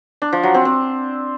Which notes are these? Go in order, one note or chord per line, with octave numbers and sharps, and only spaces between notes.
D4
F3
F#3
C4
C4